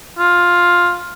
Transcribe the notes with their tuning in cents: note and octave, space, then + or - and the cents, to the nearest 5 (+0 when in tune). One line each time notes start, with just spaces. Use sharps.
F4 +10